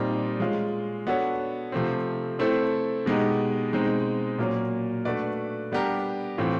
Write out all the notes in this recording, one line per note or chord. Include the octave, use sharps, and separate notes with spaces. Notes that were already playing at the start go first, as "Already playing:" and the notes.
Already playing: A#2 G3 C4 D#4
G#3 C#4 F4
B3 D4 F#4 A4 C#5
C3 F3 A3 C4
A3 C4 E4 A4 C5
B2 G#3 B3 D#4 G4
B2 G#3 C4 D#4
A#2 F#3 A#3 C#4
A3 D4 F#4 B4 D5
G3 B3 D4 G4 A#4
A2 E3 A3 C4 F4